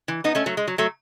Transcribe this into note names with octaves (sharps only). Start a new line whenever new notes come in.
E3
B3 D#4
A3 C#4
F#3 A3
G#3
F#3
F#3 A3